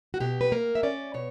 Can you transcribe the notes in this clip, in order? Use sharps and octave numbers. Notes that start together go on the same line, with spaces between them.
F#4
B2 G4
B4
A#3 A#4
E5
C#4 D5
B2 C#5